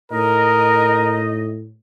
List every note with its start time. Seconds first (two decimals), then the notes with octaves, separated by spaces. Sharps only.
0.11 A2 D#4 A#4 D#5